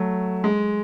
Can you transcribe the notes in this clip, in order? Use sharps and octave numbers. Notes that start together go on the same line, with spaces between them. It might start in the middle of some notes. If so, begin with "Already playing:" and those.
Already playing: F#3 A3
G#3